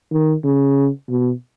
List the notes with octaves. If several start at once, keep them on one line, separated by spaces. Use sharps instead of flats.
D#3
C#3
B2